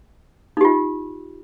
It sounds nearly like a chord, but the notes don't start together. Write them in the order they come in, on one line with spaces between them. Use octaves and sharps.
D#4 G4 F4